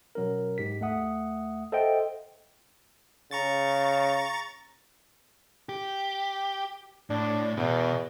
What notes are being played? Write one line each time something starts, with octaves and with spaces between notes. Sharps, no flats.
B2 F#3 C#4 A#4
G#2 G4 B6
D#2 A3 E5 F#5 D#6
A4 C5 D#5 E5 F#5 G5
C#3 A#5 C#6 A6
G4
A2 D4
E2 B2